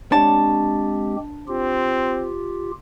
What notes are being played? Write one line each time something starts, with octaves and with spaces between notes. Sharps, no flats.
G#3 C4 D4 G4 C#5 A5
C4 F4 G4